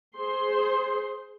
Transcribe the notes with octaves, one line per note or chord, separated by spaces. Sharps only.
G#4 C5 C6